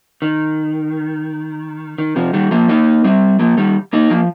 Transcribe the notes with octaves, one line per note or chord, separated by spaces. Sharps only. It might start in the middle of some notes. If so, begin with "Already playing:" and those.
D#3
D#3
C3 F3
D#3 G3
F3 A#3
A#3 D#4
G3 C4
F3 A#3
D#3 G3
A#3 D#4
F3 A#3